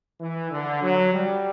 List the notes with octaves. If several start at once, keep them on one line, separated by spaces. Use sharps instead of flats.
E3
D3
F#3
G3